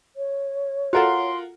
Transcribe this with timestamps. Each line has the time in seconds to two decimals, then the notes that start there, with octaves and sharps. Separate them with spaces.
0.16 C#5
0.93 F4 F#4 A4 A#4 F#5 C6